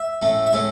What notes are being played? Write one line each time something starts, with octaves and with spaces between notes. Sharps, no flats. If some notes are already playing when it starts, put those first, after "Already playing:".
Already playing: E5
A2 A3 C#4
E5
A2 A3 C#4 C#5